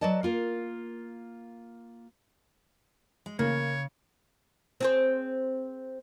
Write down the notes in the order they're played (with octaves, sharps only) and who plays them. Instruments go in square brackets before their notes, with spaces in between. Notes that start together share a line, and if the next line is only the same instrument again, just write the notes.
[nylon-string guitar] F#3 B4 D5 D#5 A5
A#3 F4 A#4
[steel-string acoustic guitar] G#3
[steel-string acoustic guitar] C#3 [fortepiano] A#3 [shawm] C#5
[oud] C4 G#4 C5